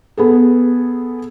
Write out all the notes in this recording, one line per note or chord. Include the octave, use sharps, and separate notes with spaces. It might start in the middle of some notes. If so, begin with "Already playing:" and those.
B3 G#4 A4